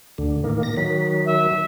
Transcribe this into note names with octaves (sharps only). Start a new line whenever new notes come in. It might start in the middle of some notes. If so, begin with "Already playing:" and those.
D2 D3
A2 D#3 A#3
A#6
D#3 F#3 B6
E5